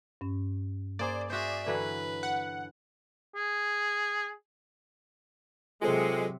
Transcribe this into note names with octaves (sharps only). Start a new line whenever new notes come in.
G2 C#4
A#3 G#4 C5 D5
F#4 G#4 C5 E5
D3 E3 F#3 B4
F#5
G#4
C3 F#3 G#3 F4 A4 C5